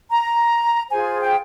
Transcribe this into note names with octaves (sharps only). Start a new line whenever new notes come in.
A#5
F4 G#4 C5 G#5
G5